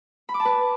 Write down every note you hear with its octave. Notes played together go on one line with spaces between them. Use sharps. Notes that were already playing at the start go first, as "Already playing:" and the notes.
B5
D6
A5
B4